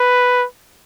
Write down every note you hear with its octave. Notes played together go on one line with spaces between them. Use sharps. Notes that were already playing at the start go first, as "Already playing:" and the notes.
Already playing: B4